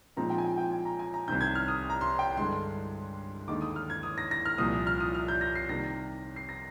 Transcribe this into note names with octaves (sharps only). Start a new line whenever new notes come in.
A#2 F3 G#3 C4 D#4 A#5
G5
G#5
G5
G5
G#5
A#5
G#5
A#5
C2 C3 D#3 G6
G#6
F6
D#6
A#5
C6
G5
G2 D3 G#3 C6
D#2 D3 G#3 D#4 D6
D#6
F6
G#6
D#6
A#6
A#6
F6
C2 A#2 F3 D#6
F6
D#6
F6
G6
A#6
C7
C3 D#3 G3 A#3 A#6
C7
A#6